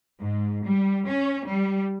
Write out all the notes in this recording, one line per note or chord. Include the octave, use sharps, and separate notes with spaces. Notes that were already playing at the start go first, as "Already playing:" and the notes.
G#2
G3
C#4
G3